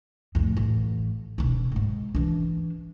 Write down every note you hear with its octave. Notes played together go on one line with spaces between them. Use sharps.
F2 A2
A1
E1 E4
G#2 G#3
E3 D4